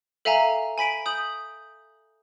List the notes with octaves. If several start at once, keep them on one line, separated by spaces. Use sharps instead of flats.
A4 E5 F5 G#5 A#5
G#5 B5 B6 D7
D#6 G6 F#7